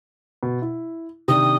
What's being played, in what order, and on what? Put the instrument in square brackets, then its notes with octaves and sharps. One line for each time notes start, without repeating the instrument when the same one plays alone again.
[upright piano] B2
E4
[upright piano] C3 D#3 D4 [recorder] D#6